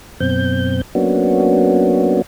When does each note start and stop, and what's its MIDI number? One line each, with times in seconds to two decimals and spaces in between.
0.20 0.81 42
0.20 0.81 47
0.20 0.81 60
0.20 0.81 91
0.95 2.22 54
0.95 2.22 58
0.95 2.22 59
0.95 2.22 61
0.95 2.22 62
0.95 2.22 66